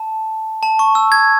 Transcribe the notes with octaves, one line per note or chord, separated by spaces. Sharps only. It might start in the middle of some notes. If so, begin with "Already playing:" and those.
Already playing: A5
A5
C#6
E6
G#6